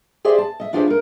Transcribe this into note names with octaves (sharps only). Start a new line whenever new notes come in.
G4 G#4 C5 D5 E5
A5
D#5 E5
D4 E4 F4 G4 G#4 C5
D#4 A#4